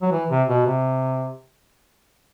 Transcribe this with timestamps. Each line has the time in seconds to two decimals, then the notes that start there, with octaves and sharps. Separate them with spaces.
0.02 F#3
0.12 E3
0.30 C3
0.48 B2
0.66 C3